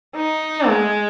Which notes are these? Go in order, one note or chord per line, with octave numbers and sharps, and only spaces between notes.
D#4
G#3